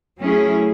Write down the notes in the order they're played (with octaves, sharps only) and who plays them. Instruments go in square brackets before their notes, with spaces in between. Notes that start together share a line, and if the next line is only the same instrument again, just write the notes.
[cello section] F#3 A3 C#4 E4 G#4